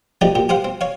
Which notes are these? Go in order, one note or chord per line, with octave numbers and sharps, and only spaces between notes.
F3 A3 D#4 G4 D5
A#2 G4
G4 C5 F5 F#5
C4
C#5 F5